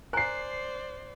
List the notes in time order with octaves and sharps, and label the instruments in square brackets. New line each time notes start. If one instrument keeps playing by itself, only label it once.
[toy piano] A#4 G#5 A#5 [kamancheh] C5 D5 [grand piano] F#6 C7